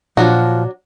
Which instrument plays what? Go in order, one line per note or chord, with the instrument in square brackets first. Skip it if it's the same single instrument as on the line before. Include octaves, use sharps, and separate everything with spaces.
[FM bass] A#2 [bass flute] F3 [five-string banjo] F#3 D4 F#4